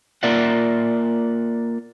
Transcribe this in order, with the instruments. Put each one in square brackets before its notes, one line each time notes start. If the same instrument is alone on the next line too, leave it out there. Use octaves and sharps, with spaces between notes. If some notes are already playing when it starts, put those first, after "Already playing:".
[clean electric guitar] A#3 F4 D5 E5 F#5